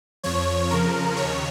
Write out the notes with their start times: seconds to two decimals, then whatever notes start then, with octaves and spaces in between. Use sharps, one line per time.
0.24 F2 F3 C#5
0.70 F2 C#3 F3 A#4
1.16 D#2 C#3 C#5